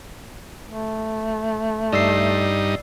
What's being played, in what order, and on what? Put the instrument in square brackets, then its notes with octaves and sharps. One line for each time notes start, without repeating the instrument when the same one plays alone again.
[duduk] A3
[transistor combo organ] G2 D#4 [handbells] D5 E6 C7